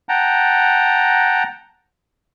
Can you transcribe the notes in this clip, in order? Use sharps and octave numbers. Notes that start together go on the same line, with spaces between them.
F#5 G5 A5 A#5